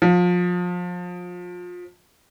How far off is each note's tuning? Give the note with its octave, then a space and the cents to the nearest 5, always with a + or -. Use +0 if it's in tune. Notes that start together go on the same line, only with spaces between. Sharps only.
F3 +30